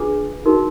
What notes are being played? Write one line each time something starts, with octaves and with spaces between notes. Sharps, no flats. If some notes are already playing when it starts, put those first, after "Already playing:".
Already playing: D4 F4 G#4 B4
D#4 F#4 A#4